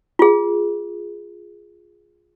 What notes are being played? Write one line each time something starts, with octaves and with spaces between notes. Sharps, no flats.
F4 G#4